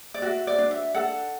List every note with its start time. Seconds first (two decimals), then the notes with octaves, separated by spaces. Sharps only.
0.14 D5
0.22 F#4 E5
0.47 D5
0.59 D4
0.71 E5
0.95 A4 F#5